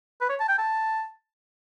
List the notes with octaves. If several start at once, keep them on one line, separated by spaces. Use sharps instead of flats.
B4
C#5
A5
G5
A5